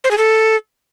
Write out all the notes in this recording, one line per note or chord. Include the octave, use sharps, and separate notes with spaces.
C5
G#4
A4